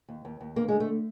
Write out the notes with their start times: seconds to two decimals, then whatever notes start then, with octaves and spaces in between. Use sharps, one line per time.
0.08 D#2
0.25 D#2
0.40 D#2
0.56 D3 A#3
0.68 D3 G#3
0.80 A3